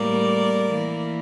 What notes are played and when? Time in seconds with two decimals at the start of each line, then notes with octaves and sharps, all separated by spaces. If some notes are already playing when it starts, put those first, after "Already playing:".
Already playing: A2 G3 A#3 A#4 D5
0.71 E3 A#3